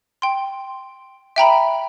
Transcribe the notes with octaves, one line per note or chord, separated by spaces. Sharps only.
G5 C6
E5 G5 A#5 B5